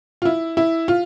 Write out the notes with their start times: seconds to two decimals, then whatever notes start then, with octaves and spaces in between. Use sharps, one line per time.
0.22 F4
0.25 E4
0.57 E4
0.88 F4